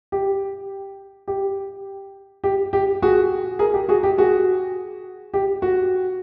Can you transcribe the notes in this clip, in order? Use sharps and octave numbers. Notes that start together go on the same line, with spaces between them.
G4
G4
G4
G4
F#4 G#4
G#4 A#4
G4
F#4 G#4
G4
F#4 G#4
G4
F#4